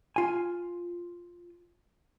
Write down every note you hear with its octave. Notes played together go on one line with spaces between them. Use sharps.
F4 G#5